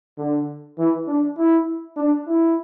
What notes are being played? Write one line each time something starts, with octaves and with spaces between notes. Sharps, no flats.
D3
E3
D4
E4
D4
E4